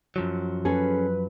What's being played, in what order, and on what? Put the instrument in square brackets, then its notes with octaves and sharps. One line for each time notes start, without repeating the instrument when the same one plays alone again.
[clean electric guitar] F#2 F3 F#3
[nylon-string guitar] C#4 G#4 A4 [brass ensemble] B4